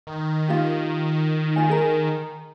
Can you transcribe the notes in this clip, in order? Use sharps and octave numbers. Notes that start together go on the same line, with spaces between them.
D#3
D#4 F4 G4
F4 D#5 G#5
G#4 A#4